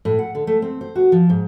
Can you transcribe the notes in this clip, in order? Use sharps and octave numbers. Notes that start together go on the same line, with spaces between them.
A2
F#5
D3
A3
C4
C5
F#4
F3
G#2